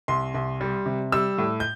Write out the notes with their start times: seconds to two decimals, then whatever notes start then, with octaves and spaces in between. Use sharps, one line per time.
0.08 C2 C6
0.34 C2
0.61 G3
0.86 C3
1.12 G3 E6
1.38 A2
1.60 G6